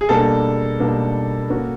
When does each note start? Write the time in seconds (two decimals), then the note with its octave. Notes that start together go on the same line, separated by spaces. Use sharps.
0.01 G#4
0.09 B2 G3 A#3 D4 A4
0.79 B2 G3 A#3 D4
1.50 A#3 C#4 F#4